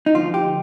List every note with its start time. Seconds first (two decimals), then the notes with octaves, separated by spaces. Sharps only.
0.06 D#4
0.14 D2 D3 F3 F4
0.34 G4